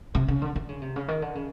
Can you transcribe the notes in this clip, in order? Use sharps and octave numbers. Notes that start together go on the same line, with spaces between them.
C3
C#3
D3
D3
C#3
C3
C#3
D#3
D3
C#3